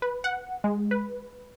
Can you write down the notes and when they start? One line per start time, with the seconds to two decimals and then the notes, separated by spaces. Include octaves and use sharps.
0.02 B4
0.24 F#5
0.64 G#3
0.91 B4